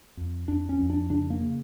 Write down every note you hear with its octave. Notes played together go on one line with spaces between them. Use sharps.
F2
F2 D4
C#4
F2
D4
C#3 D4
A#3
C#3